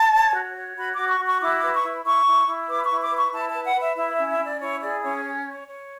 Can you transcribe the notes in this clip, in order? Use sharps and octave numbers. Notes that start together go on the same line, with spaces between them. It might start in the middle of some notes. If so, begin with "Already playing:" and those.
Already playing: A5
C#5
F#4
C#5
F#4 B5
D6
F#4
C#6
F#4
C#6
E4 D6
D6
B4
C#6
E4
E4 C#6
E4
E4
B4 D6
C#6
E4
D6
B4 C#6
E4 A5
A5
B4
F#5
B4
E5
E4 E5
E5
C#4
E5
C#4 D5
E4 C#5
G#4 D5
C#4 C#5
C#5
C#5
C#5